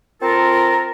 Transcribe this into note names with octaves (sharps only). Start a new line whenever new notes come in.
C4 F4 A4 A#4